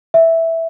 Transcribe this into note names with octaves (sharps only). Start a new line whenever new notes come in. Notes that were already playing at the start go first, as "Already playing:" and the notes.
E5